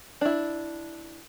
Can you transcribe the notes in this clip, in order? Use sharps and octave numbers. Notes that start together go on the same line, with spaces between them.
D4 E4